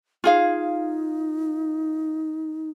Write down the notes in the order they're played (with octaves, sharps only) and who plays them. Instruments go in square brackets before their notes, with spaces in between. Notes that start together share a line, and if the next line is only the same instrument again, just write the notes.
[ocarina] D#4 [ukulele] F4 G#4 F5